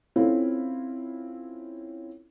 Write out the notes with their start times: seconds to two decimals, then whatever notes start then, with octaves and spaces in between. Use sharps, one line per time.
0.16 C4 C#4 E4 F4 A4